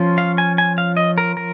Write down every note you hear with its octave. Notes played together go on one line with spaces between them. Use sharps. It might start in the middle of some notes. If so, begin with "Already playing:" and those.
Already playing: F3 C#4 F4
F5
G#5
G#5
F5
D#5
A#4
A#4